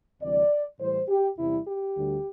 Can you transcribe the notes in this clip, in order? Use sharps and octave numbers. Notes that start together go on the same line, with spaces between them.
D2 C3 E3 G3 D5
A2 E3 G3 C5
G4
E2 C3 G3 E4
G4
D2 D3 G3